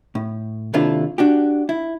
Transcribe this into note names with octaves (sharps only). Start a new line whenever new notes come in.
A2
D#2 C3 D4 E4 F4 A4
D4 F#4 G4
E4